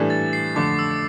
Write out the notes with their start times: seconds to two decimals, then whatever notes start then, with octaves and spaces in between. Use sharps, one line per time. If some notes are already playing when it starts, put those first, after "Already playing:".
Already playing: A2 E3 G3 D4 A4
0.10 A6
0.33 C7
0.55 F2 D3 A3 D6
0.79 E6